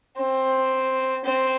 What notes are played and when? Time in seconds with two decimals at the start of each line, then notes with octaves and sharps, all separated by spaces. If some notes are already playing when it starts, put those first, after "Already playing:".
0.17 C4
1.24 C4